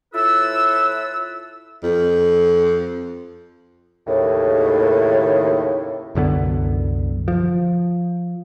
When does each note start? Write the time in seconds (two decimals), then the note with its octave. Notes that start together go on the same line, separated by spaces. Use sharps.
0.14 A2 E4 F4 A4 B4 E6
1.83 F2
4.07 D#2 A2 C#3
6.15 C2 F#2 D3 B3
7.28 F3